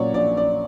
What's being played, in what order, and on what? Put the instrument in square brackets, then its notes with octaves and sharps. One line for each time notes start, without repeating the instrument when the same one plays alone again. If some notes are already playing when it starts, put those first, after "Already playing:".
Already playing: [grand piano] A#2 F#3 C#4 [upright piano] C#5 D5
[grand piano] A#1 [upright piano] D5
[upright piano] D5